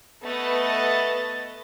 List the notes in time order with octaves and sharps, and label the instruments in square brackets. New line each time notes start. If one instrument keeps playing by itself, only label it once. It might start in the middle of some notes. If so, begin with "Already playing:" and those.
[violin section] A3 B3 B4 D#5 A6